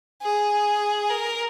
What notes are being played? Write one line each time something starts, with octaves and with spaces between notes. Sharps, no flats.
G#4
A#4